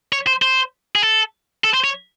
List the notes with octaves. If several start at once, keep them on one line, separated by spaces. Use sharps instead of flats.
C#5
C5
C5
G#4
A4
A4
C5
C#5